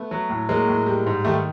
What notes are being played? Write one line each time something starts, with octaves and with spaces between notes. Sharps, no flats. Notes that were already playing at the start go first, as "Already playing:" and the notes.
Already playing: A3 B3
F#3
A2
F#3 G#3 A#3
A2
G3
G#2
D#3 G3 A3